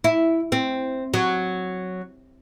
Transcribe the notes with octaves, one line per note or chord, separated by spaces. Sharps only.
E4
C4
F#3